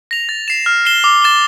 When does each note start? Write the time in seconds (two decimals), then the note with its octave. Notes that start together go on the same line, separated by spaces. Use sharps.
0.11 A#6 F7
0.29 A6
0.48 C7 E7
0.66 F6
0.85 C7 E7 G7
1.04 D6
1.22 A6 E7 G7